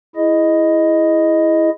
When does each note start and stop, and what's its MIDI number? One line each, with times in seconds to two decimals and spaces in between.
0.16 1.70 64
0.16 1.70 68
0.16 1.70 75